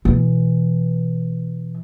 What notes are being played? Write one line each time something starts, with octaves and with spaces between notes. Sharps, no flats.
B2 E3